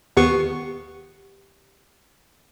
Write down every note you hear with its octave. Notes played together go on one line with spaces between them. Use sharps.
D#2 B3 G4 F#5 C#6